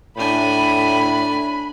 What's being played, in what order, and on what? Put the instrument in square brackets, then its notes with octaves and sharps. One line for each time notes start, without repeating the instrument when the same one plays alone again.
[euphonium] A2 [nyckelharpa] D4 G#5 [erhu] B5